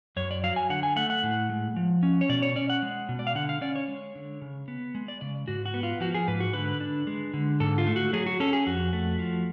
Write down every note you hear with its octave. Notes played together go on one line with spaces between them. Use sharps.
F#2 C#5
D5
F#3 F5
G#5
D3 F#5
G#5
A3 F#5
F#5
A2
G#3
F3
C#4
C#5
B2 D5
C#5
C#4 D5
F#5
G#3
B2
D5
F5
D3 F#5
F5
C#4 D5
C#5
G#3
D3
C#3
B3
G#3
D5
C#3 D5
G#2 F#4
F#4
B3
F4
F3 F#4
G#4
G#2 B4
F#4
D3 B4
D4
G#3
D3
G#2 A4
F4
A3
F#4
F#3 G#4
F#4
C#4 A4
G#4
F2 F#4
A3
F3